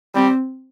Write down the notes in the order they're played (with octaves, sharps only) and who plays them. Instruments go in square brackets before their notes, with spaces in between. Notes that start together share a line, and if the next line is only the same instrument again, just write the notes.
[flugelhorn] G3 [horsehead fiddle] C4